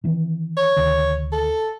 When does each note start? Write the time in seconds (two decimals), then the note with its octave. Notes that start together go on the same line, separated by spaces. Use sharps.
0.04 D#3 E3 C4
0.57 C#5
0.76 D2 C3 D#3
1.32 A4